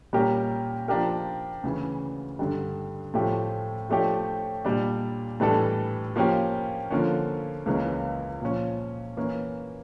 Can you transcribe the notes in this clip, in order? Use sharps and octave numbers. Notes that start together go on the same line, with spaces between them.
A#2 G3 C#4 G4 A#4
F3 A#3 D4 G4 A#4
D2 C#3 E3
G2 D3 G3
A2 F3 A3 C#4 G4
F3 A3 D4 G4 C#5
A#2 G3 D4
A2 E3 G3 D4 A4
F3 A#3 C#4 G4
D3 F3 A#3 C#4
C#2 C#3 E3 A#3 C#4
A#2 F3 C#4
E3 A#3 C#4